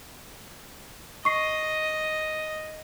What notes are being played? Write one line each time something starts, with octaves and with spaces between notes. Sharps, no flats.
D#5 C#6 C7